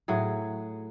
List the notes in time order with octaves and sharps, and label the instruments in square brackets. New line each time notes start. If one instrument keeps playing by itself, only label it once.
[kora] A2 F#3 G#4